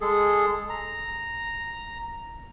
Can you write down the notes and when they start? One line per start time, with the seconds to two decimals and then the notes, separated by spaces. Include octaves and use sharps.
0.01 G#3 G#4 A4
0.70 A#5